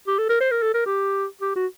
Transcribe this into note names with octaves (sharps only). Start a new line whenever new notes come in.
G4
A4
A#4
C5
A#4
A4
A#4
G4
G4
F#4